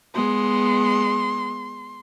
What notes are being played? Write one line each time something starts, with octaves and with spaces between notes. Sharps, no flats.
G#3 B3 C6